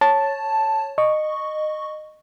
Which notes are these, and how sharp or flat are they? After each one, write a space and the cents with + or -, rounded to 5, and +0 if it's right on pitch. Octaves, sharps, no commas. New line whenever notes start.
C#5 -5 A5 +0
D#5 -20 C#6 +0